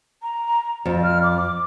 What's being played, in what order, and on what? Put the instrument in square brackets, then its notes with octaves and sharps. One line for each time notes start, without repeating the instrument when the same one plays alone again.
[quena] A#5
[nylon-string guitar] F2 [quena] D5
[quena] F6
D6